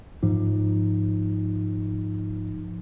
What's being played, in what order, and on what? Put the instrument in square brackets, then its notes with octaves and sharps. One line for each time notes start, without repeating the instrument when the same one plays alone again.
[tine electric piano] G#2 F3 D#4